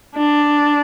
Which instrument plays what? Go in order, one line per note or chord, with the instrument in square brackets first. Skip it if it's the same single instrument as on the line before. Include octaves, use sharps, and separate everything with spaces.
[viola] D4